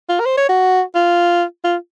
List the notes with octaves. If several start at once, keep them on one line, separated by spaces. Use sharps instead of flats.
F4
A#4
C5
C#5
F#4
F4
F4